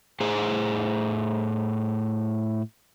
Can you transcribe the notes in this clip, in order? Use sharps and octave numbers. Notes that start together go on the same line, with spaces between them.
A2 G#4 C5